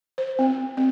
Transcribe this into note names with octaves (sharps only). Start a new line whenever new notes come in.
C5
C4
C4